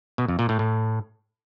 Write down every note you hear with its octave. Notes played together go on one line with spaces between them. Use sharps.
B2
F2
A#2
A2
A2